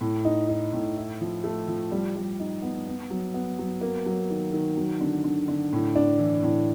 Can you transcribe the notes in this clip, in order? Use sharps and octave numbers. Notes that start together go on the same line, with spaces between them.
A2
D#4
D#4
A2
E4
F3
A3
F3
G3
G3
D#4
B3
B3
F#3
B3
F#3
A#3
F#3
D#3
D#3
F#3
D3
D3
D3
A2
D4
E3
A2